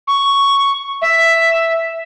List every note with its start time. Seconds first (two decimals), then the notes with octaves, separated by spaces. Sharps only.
0.07 C#6
1.02 E5